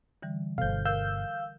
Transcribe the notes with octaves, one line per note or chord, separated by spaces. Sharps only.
D3 E3 G3
G1 B2 A4 C5 F5 G6
A#4 F5 E6 G6